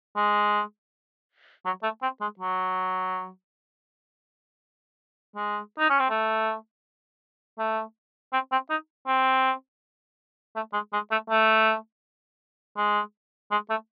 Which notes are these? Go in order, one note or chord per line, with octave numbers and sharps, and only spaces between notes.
G#3
F#3
A3
C4
G#3
F#3
G#3
D#4
C#4
C4
A3
A3
C4
C4
D#4
C4
A3
G#3
G#3
A3
A3
G#3
G#3
A3